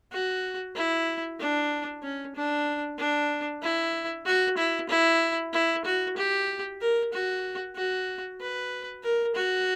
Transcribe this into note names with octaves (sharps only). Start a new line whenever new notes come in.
F#4
E4
D4
C#4
D4
D4
E4
F#4
E4
E4
E4
F#4
G4
A#4
F#4
F#4
B4
A#4
F#4